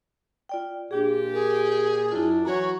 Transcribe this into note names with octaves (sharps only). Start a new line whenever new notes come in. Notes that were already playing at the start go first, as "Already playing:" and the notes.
F4 D5 G5
A#2 D4 F4 G4 G#4
G#4 A#4
F#2 D4 E4 F4
E3 F#3 F#4 C#5 A#5